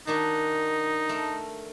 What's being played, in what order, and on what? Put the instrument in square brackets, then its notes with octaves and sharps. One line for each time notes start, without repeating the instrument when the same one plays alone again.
[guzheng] D#3 D4 F#4 [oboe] D#4
[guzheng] A3 A#4